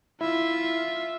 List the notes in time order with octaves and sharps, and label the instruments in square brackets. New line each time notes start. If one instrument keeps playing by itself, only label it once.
[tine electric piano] E4 [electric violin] F4 E5